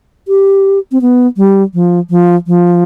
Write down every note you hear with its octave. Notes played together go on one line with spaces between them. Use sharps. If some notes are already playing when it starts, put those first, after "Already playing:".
G4
C4
B3
G3
F3
F3
F3